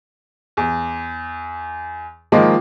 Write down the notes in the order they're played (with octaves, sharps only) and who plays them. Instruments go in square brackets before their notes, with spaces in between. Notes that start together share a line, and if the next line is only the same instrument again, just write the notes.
[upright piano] E2
D#3 F3 G#3 A#3